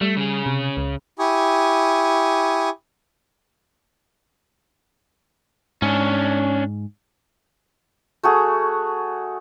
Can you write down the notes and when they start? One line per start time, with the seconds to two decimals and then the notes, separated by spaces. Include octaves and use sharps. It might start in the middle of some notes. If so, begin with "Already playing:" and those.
0.01 G3 A3
0.17 C#3 G#4
0.46 C3
0.77 C#2
1.19 E4 G4 G#5 C#6 D#6
5.82 G#2 C#4 D4
8.23 A3 F#4 G#4